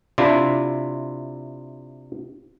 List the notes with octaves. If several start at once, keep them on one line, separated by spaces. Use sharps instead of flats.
C3 D4 E4 F4